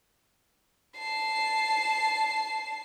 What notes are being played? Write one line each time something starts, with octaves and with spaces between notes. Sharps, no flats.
A5 C7